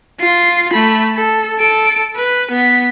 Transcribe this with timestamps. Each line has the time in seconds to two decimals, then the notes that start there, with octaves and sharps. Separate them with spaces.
0.20 F4 C7
0.73 A3 B5
1.16 A4
1.59 A4 D7
2.16 B4
2.51 B3 B6